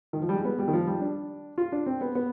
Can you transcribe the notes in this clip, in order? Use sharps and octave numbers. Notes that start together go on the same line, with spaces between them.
D#3
F3
G3
G#3
B3
G3
D#3
F3
G3
D4
F4
D4
C4
B3
B3